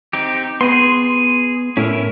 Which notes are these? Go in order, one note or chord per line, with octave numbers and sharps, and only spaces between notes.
C4 D#4 G4
B3 G#4 C6
A2 C#4 E4 A#4